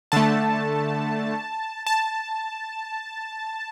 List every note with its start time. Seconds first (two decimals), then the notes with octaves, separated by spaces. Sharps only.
0.12 D3 A3 A5
1.87 A5